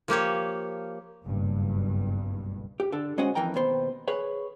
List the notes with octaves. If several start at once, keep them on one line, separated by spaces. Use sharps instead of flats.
F3 A#3 G4 C#5
F#1 B1 G2 B2
G4
D3 A4
G#3 C#4 F#4 C5 D#5 F#5
F2 E3 A#4 G5 A#5
D#2 B2 B3 C5
G#4 B4 C#5